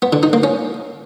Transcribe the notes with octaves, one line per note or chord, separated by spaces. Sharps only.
B3
D3
D#4
A#3
C#4